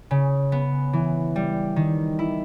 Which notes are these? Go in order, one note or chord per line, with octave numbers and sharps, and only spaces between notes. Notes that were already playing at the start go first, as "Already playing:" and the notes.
C#3
B3
E3
G3
D#3
E4